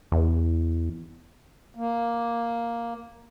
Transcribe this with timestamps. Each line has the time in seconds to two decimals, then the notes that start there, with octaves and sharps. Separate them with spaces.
0.12 E2
1.75 A#3